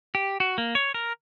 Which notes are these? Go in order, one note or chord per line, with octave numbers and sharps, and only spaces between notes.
G4
F#4
A#3
C#5
A#4